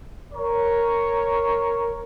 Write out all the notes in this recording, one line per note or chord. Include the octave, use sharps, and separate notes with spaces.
A#4 C#5